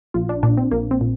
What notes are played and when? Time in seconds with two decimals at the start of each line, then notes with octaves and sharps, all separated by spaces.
0.14 A#1 F4
0.29 D4
0.43 A#2 D4
0.57 C4
0.71 A#1 A#3
0.91 C4
1.01 A#2